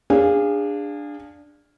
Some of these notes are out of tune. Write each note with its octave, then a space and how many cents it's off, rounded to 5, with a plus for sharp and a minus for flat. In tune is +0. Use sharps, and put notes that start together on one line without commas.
D4 +5 G#4 -25 F5 +0